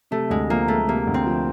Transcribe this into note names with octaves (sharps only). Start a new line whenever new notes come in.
C3 A3
D2 G#3
F3 A#3
G#3 A3
C3 A#3
D2
C4
F3